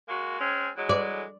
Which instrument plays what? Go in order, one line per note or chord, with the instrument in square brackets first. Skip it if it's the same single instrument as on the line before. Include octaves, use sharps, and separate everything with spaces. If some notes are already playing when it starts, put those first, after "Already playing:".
[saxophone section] G#3 A#3 F#4
G#3 C4 C#4
E3 F#3 G#3
[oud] D5